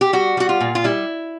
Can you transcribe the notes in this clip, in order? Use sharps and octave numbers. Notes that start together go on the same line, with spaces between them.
G4
G3 F#4
G3 F#4
F4
A#2
F4
G3 E4